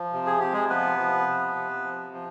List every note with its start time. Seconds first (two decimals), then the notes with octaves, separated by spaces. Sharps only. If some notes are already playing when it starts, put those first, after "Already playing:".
Already playing: F3
0.13 C3
0.26 G#4
0.40 C3 G4
0.53 G#3 G#4
0.69 F3 B3 B4
0.98 F3
1.27 C3
1.55 C3
1.84 F3
2.13 F3